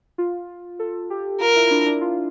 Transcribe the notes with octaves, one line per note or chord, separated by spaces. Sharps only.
F4
A4
G4
F4 A#4
E4
E4
D4
D4
F4